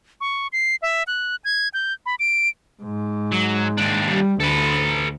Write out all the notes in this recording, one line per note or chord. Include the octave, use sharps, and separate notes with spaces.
C#6
C7
E5
F#6
G#6
G6
B5
D7
G#2
F#3
D#2 D4
G3
D2 A4 B4